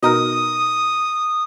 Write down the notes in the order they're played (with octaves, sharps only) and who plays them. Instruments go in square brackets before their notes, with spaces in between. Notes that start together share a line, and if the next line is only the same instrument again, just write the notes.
[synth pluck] B2 D#4 A#4 [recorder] D#6